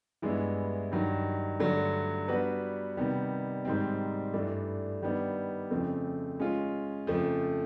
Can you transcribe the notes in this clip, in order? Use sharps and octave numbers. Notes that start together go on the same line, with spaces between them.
G2 E3 G#3 B3 E4
G2 D#3 F#3
G2 D3 F#3 A3
G3 B3 D4 F#4 B4
C3 D#3 G3 B3
G#2 D#3 G3 C4
G2 E3 A3 D4
D#3 G3 B3 D4
F2 C#3 F3 A3 C4
G#3 C#4 F4
F2 C#3 F3 A3